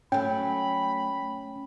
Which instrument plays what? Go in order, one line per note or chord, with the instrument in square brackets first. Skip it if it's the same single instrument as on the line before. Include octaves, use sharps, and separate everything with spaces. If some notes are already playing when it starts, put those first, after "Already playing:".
[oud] F#3 A3 [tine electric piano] C#4 [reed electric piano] G5 [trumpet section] B5